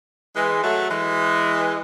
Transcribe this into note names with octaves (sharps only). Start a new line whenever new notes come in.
E3 G#3
F#3 A3
E3 G#3